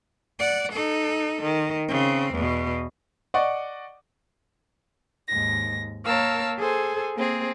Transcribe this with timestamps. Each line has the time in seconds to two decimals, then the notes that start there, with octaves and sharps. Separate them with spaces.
0.39 D5 F#5
0.72 D#4 A4
1.42 D#3
1.88 C#3 C4
2.34 E2 B2
3.34 D5 D#5 F#5 C#6
5.27 D#2 G#2 A#6
6.04 A#3 A#4 C#5 F5 A5 E6
6.57 G#4 A4 C5 G#5
7.15 A#3 C4 G#4